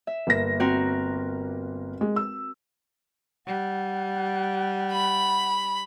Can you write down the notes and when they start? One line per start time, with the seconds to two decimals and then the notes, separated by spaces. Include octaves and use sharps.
0.07 E5
0.27 G1 A#3 A#6
0.60 C4 F#4 A#4
2.01 G#3
2.16 E6
3.47 G3 F#5
4.92 B5